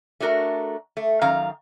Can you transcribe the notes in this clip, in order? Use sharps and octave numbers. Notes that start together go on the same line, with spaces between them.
A3 D4 F#4 A#4
A3
F#2 D#3 F5 A#5